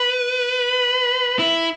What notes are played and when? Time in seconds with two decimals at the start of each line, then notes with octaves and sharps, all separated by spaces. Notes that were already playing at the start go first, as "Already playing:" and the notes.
Already playing: B4
1.39 E4